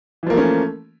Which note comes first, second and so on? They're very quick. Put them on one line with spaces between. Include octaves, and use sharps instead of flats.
E3 F3 A#3 A3 C#4